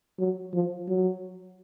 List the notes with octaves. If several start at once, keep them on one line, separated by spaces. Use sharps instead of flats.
F#3
F3
F#3